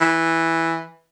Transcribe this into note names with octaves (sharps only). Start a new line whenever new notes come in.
E3